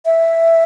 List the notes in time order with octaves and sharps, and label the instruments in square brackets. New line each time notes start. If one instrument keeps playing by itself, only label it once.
[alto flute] E5